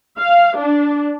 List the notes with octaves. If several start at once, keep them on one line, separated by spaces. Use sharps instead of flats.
F5
D4